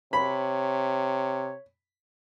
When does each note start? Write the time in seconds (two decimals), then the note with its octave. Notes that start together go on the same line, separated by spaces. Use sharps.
0.13 C3 C#5 B5